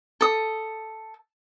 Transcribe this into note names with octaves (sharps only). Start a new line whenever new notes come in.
A4 D#6